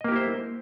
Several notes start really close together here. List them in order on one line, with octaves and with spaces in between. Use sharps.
D#5 A#3 G4 E4 C5